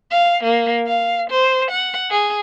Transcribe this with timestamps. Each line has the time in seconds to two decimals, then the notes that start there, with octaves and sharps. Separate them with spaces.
0.12 F5
0.44 A#3
0.87 F5
1.30 C5
1.71 F#5
2.11 G#4